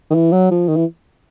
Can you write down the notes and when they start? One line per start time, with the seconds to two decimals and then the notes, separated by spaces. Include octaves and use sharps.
0.11 D#3
0.15 E3
0.32 F#3
0.51 F3
0.68 D#3
0.77 E3